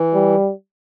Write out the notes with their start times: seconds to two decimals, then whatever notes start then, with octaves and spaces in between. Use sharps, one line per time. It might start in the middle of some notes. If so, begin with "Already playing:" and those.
Already playing: E3
0.14 G3